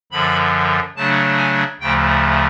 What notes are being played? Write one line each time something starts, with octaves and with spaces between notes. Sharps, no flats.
F#2 D3 F3 B5
C#3 F#3 A3 D4 A5
G#5
D2 C#3 F3 A3 G5